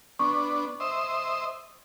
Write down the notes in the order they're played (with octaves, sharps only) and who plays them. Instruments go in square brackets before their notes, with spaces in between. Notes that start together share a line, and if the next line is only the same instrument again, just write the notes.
[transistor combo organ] B3 D4 [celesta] C#6
[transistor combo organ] C5 D#5 E5